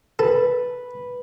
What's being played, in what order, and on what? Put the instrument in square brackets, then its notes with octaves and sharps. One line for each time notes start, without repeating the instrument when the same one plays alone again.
[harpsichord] A4 [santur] B4